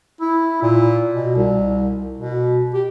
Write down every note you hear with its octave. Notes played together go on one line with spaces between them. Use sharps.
E4
A#2
B2
C2
B2
G4